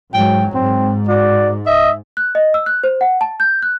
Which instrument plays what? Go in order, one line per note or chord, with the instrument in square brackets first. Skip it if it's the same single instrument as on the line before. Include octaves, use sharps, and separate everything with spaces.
[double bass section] G#2 F#3 [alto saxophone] G5
[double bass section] G#2 [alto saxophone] C4
[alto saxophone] F#4 [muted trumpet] D5
[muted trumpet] D#5 [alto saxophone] E5
[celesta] F#6
D#5
E6
F#6
C5
F#5
A5
G6
F#6